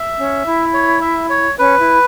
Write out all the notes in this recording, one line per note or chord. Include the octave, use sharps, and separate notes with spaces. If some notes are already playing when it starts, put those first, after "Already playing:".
Already playing: E5
C#4
E4
C#5
E5
C#5
C#4 B4
E4